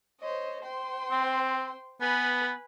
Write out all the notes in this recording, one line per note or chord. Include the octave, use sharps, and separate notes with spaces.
C5 C#5 D#5
C5 G5 C6
C4
B3 B4 G#5 B5